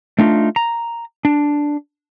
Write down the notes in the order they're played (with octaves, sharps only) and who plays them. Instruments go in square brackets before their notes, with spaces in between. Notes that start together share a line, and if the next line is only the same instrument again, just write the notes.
[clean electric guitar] A3 D4 D#4 F4
A#5
D4